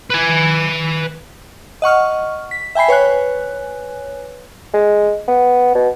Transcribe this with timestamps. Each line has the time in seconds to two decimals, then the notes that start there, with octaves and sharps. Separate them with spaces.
0.10 B4 G#5
1.82 D#5 F#5 C#6 F6
2.51 B6
2.75 E5 G5 G#5 B5 C7
2.88 B4 C#5 G#5 F#6
4.74 G#3
5.28 B3
5.75 B2